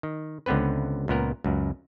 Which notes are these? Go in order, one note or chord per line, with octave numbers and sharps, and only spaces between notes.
D#3
C#2 D3 B3 C4 B4
C#2 A#2 B3 A#4
C#2 F#2